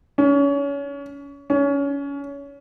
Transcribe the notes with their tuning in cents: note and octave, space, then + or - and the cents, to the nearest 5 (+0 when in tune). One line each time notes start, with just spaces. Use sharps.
C#4 +30
C#4 +25